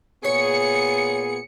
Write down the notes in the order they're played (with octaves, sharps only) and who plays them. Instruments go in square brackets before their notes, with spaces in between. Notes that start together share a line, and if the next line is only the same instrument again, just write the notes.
[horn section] A#2 B3 G#4 [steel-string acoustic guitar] C#5 [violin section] C#7